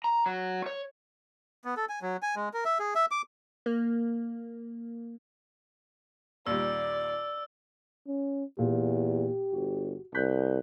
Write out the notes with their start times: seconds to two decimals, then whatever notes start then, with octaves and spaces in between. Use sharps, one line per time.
0.04 A#5
0.26 F#3
0.66 C#5
1.65 B3
1.77 A4
1.89 G#5
2.02 F#3
2.22 G#5
2.36 G#3
2.54 A#4
2.65 E5
2.79 G#4
2.95 E5
3.11 D6
3.66 A#3
6.47 D#2 A#2 G3 D5 E6
8.07 C#4
8.59 E2 A#2 G4
9.53 G1 F#4
10.15 C2 F#6 G6 B6